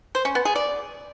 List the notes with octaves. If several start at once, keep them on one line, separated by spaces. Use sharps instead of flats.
C5
C#4
B3
G#4
D5